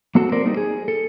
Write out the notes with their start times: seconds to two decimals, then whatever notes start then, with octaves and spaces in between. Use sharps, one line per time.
0.15 A#3 C4 F#4 A4
0.32 A#4 C5 D5
0.45 G3 A#3 D#4
0.57 G#4
0.88 A4